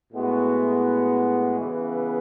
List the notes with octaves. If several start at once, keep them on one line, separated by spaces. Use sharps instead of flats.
A2 G#3 B3 F#4
C#3 E3 B3